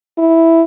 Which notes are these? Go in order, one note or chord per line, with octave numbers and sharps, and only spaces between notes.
E4